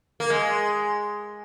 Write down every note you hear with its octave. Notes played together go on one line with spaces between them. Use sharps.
A#3
G#3